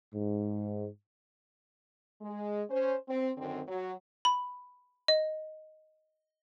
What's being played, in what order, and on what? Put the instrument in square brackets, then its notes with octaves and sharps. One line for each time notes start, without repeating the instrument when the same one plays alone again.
[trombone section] G#2
[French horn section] G#3
C#4 C5
C4
F#2 D3 D#3 C4
F#3
[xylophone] B5
D#5